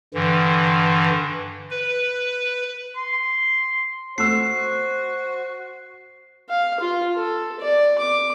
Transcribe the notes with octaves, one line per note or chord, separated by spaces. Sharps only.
G2 D3 E3
B4
C6
A3 F#4 C5 E6 C7
F5
F4
A4
D5
D6